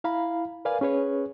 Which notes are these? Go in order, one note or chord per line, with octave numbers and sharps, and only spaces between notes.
E4 F5 A#5 B5
A#4 B4 D5 F5 G#5
C#4 G#4 B4 C#5